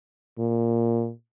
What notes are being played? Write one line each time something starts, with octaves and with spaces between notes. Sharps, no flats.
A#2